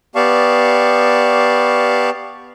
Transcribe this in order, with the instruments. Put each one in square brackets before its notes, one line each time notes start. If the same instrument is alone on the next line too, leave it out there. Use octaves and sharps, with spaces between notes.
[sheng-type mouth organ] B3 G4 D5 F5 A5 C#6